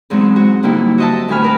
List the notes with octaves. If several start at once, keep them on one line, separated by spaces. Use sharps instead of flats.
E2 G#2 F#3 G#3 C4
D#4 F#4
D3 F#3 G3 A#3 D#4 E4
F#4 C5 D#5 E5 A5
D2 A2 G3 G#5 B5 F6
F#4 A#4 B4